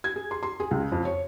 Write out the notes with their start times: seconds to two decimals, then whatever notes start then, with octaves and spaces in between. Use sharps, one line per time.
0.04 G#6
0.16 G#4
0.31 C6
0.43 C6
0.60 G#4
0.71 C#2
0.92 F2
1.05 C#5